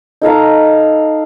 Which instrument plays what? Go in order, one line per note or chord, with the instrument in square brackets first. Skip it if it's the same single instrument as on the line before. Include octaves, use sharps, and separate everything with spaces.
[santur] D#4 A4 F5 A#5